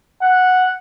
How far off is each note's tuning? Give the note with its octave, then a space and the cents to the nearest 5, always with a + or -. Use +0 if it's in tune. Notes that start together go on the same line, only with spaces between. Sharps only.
F#5 -5